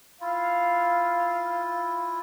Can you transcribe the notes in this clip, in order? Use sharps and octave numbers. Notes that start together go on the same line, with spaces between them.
E4 F4 F5